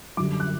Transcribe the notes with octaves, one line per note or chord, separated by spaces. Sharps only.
F#2 D3 G3 D6
F#6